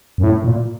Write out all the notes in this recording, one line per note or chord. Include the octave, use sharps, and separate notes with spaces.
F#2
A2
A#2